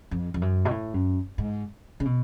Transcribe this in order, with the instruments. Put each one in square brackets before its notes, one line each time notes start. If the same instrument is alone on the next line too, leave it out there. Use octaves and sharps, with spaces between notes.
[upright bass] F2
F2
F#2
B2
A2
F#2
G#2
C#3
B2